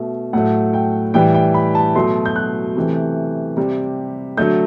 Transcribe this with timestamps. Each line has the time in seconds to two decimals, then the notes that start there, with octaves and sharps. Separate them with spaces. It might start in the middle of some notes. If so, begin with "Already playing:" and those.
Already playing: B2 A3 E5
0.33 A2 F#3 A3 F#5
0.73 G5
1.14 A2 E3 G3 G5
1.34 G5
1.54 B5
1.75 A5
1.95 B2 F#3 A3 C6
2.25 G6
2.36 F#6
2.76 C3 E3 A3
3.57 C3 G3
4.37 D3 F#3 A3 G6